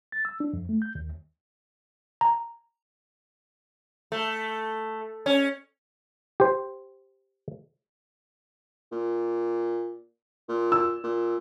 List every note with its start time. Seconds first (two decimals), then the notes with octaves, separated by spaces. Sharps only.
0.12 A6
0.25 E6
0.40 D4
0.53 F2
0.69 A3
0.82 G6
0.95 D#2
2.21 A#5
4.12 A3
5.26 C#4
6.40 G4 C5
8.92 A#2
10.49 A#2
10.72 E6
11.04 A#2